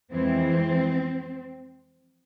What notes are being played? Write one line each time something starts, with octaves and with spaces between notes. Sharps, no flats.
F2 E3 G#3 C4